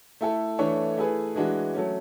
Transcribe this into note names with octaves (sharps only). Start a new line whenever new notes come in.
A3 E4 A4
E3 A3 D4 A4 C#5
A3 E4 G#4 B4
E3 G#3 D4 F#4
F#3 A3 C#4